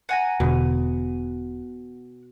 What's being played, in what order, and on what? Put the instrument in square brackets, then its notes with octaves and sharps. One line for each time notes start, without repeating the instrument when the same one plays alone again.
[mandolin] F#5 G#5 A#5
[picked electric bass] E1 D3 [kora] B2